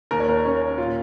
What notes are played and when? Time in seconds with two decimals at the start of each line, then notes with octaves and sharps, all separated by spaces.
0.11 D#2 A#4
0.20 C#5
0.28 D#2 A#4
0.45 C#4
0.62 D#2
0.78 A#2 F4